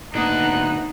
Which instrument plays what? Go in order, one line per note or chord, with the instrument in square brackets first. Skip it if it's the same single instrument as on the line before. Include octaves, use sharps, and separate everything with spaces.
[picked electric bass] G#1 A#2 A#3 [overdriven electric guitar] D2 D4 [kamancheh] B3 F#6 [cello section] D#4